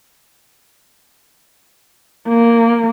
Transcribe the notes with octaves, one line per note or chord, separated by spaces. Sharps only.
A#3